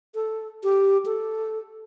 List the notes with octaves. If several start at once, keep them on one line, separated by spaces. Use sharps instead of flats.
A4
G4
A4